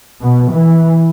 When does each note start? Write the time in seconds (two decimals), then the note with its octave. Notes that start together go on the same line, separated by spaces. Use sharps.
0.22 B2
0.52 E3